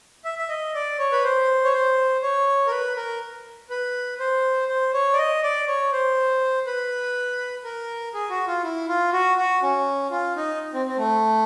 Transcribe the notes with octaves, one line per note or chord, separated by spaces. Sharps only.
E5
E5
D#5
D5
C#5
B4
C5
C#5
C5
C#5
A#4
B4
A#4
B4
C5
C5
C#5
D5
D#5
D5
C#5
C5
B4
A#4
G#4
F#4
F4
E4
F4
F#4
F#4
C#4
F4
D#4
C4
C4
A3